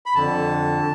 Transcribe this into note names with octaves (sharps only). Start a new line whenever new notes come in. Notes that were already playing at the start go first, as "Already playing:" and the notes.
B5
F2 D3 A5